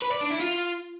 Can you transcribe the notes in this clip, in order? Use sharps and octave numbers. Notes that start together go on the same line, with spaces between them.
B4
D5
D4
E4
F4